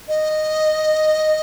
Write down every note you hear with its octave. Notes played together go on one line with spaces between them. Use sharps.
D#5